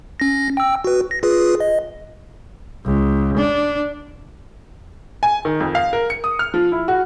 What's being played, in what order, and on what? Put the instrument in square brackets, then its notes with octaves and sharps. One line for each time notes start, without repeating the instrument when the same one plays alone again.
[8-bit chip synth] C#4 A#6
G5 E6
F#4 B4
A#6
F4 G#4 B4
D#5
[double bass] C#2
D4
[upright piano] G#5
D#3
F2
F5
A#4
C#7
D#6
F6
F3
E4
F#4